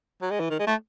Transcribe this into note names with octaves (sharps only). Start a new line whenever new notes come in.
F#3
G#3
E3
D#3
G#3
A3